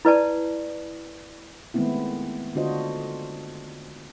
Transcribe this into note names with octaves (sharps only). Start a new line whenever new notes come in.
E4 B4 D5 A5
D#3 G#3 A3 B3 C4 E4
D3 D4 F4 F#4 C5 D#5